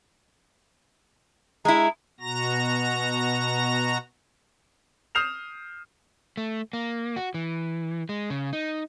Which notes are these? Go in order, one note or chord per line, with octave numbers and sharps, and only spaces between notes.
G#3 E4 A#5
B2 F#4 A#5 A#6
D#6 F6 G6 C7 E7 F7
A3
A#3
F#4
E3
G#3
C#3
D#4